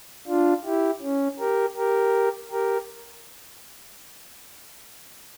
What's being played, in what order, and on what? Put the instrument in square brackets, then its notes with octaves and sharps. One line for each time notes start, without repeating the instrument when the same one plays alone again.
[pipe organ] D4 F4
E4 G4
C#4
G4 A#4
G4 A#4
G4 A#4